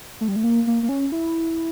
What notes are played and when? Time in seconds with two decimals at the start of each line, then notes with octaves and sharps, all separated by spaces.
0.21 A3
0.28 G3
0.36 A3
0.44 A#3
0.67 A#3
0.83 A#3
0.89 C#4
1.12 E4